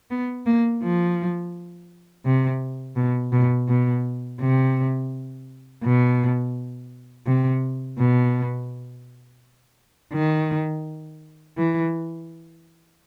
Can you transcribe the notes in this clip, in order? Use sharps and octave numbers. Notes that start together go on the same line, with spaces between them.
B3
A#3
F3
C3
B2
B2
B2
C3
B2
C3
B2
D#3
E3